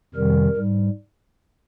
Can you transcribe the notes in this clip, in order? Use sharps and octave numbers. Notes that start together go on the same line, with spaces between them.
F2 C3 D#3 G3 A#4
G#2 G3